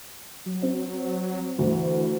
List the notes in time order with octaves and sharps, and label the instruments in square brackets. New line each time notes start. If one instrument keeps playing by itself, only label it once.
[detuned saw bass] F#3
[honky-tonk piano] C4
[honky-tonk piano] D2 [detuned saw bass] E3